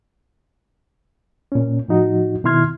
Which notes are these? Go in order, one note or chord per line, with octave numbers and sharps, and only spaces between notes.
A#2 C#4
A2 F3 D#4 F#4
B2 D#3 E4 C6 F6 G#6